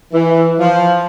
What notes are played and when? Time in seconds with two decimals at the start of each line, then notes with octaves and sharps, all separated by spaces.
0.12 E3
0.59 F3